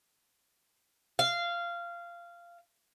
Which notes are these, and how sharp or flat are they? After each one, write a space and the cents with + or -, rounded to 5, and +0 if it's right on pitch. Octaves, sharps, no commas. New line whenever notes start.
F5 -15